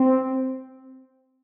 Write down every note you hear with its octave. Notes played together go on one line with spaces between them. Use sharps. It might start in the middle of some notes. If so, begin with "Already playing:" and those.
Already playing: C4